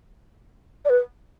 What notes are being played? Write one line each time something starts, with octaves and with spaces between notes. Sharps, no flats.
D5
B4